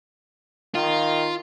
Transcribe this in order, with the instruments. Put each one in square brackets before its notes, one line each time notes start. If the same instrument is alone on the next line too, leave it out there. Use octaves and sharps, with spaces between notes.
[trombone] D#3 [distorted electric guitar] F4